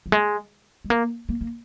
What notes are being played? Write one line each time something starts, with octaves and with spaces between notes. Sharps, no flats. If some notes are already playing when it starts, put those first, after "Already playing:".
F3
G#3
G#3
A#3
A#3
A#3